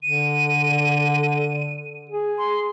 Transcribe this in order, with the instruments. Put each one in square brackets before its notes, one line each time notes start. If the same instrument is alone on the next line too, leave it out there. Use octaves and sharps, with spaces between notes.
[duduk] D3 [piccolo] D#7
[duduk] G#4
[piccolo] C6